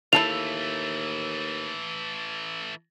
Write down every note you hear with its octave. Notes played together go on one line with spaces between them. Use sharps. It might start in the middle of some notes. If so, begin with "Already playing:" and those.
D#2 E3 A3 E4 A4 F5 F7